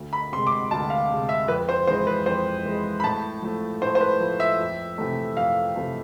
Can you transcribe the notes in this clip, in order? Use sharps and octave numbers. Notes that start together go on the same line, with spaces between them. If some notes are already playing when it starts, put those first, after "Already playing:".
Already playing: D2
B5
C3 G#3 C6
D6
C6
D2 A5
F5
C3 G#3
E5
F2 B4
C5
E3 G#3 C5
B4
F2 C5
E3 G#3
B5
A2 A5
F3 A3
A2 C5
C5
B4
F3 A3
E5
F2
C3 E3 A3
F2 F5
C3 E3 A3